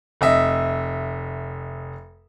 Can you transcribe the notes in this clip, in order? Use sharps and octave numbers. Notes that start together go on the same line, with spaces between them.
F1 D#5 E5